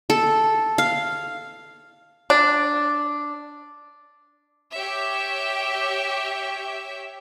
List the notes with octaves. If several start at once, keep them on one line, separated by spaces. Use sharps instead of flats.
A4
F5
D4
G4 C#5 E5